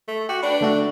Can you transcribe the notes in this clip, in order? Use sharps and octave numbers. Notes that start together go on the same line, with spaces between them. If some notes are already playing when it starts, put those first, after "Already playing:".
A3
F#4 G4
D4 B4
D3 A3 F#4